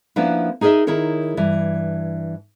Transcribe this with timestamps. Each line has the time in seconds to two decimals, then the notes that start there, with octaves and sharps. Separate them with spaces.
0.16 F3 A#3 B3 C#4 D4 E4
0.61 D#4 G#4 A#4 C#5 D#5 E5
0.87 D#3 E4 G#4 A#4 C#5
1.37 G2 E3